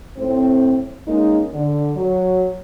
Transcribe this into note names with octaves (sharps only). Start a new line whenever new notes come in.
A2 C4
G#3 A#3 C#4 D#4
D3
F#3